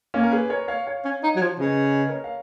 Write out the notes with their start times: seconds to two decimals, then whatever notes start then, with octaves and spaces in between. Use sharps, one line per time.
0.14 A#3 C#4
0.23 A#4
0.31 G#4 B4
0.50 A#4 C#5
0.68 C#5 F5
0.87 C#5 F5
1.05 C#4
1.23 D#4
1.36 F#3
1.42 F3
1.59 C#3 B4 D#5
1.84 B4 D#5
2.09 A#4 C#5
2.24 F5